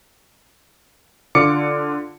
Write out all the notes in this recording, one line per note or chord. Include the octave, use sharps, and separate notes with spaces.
D3 F4 D6 C#7